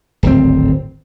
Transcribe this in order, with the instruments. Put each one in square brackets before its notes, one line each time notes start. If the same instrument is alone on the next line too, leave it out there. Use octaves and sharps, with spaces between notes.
[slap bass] D1 G#1 C4